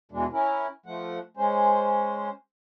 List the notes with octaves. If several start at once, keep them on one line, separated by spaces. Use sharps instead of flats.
E2 B2 E3 G#3 D4
C#4 E4 A#4
F3 A3 F#5
G#3 C#4 C5